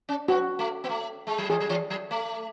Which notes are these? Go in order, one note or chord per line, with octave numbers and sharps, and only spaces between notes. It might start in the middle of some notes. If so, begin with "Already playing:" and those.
C#4
B3 F#4
A3
B3
A3
G#3
F#3
E3 G#4
F#3
E3
F#3
A3